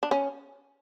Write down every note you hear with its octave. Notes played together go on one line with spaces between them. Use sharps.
D4
C#4